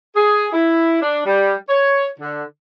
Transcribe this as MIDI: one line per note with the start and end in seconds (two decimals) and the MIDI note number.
0.15 0.48 68
0.53 0.99 64
1.02 1.20 62
1.26 1.54 55
1.69 2.07 73
2.19 2.43 50